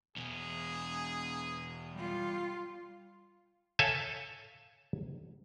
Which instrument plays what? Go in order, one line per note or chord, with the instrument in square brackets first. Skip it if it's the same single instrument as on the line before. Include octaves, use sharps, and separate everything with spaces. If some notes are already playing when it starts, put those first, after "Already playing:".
[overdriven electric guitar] E2 B2 [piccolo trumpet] G#4
[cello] G3 F4
[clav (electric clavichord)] A4 C#5 E5 F5 G#5 A5